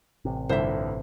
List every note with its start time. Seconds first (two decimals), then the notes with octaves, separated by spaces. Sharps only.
0.25 A1 C3
0.49 G1 C2 C5 E5